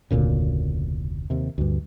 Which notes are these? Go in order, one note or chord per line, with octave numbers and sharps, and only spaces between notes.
F1 D2 A#2 C#3
D#2 C3
D2 G2